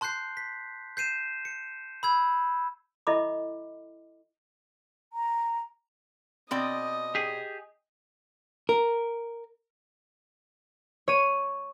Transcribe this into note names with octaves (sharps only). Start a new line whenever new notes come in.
A5 C6 F#6 G6 C7
B6
G6 C7 D#7 E7
C#7
B5 E6 G#6
E4 A4 D#5 E5 B5 D6
A#5
B2 C4 D5 D#5
G4 G#4
A#4
C#5 D#7